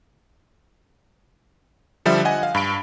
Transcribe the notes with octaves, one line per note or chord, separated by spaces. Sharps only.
D3 F3 G3 E5
D#5 F#5 G#5
F5
G2 B5 D7